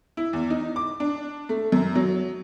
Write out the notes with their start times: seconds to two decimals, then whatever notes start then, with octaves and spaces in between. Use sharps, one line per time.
0.17 E4
0.33 E2
0.50 D#4
0.76 D6
1.00 D4
1.49 A3
1.72 F#2
1.95 F#3